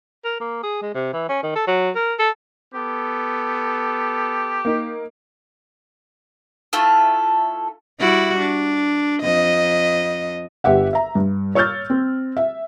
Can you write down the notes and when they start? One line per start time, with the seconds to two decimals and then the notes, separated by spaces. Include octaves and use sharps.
0.25 A#4
0.40 A#3
0.63 G#4
0.82 G#3
0.94 C3
1.13 E3
1.29 C#4
1.43 D#3
1.56 A4
1.68 F#3
1.95 A#4
2.19 A4
2.74 B3 G4 A4
4.65 A#3 D#4
6.73 A3 E4 F4 A4
8.00 G3 E4 F#4
8.39 D4
9.22 F2 D#5
10.64 G1 G4 E5 F#5
10.93 E5 A#5
11.15 G2
11.55 C#5 C#6 E6 F6 G6 A6
11.90 C4
12.37 E5